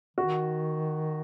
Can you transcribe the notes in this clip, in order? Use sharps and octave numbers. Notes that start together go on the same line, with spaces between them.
D#3 F#4